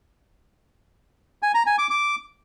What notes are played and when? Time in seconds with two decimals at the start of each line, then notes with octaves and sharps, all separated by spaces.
1.43 G#5
1.54 A#5
1.66 G#5
1.78 D6
1.90 D6